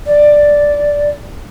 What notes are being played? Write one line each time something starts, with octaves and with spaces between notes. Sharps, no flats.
D5